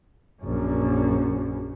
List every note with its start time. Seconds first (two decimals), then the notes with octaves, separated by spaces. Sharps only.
0.42 A#1 F#2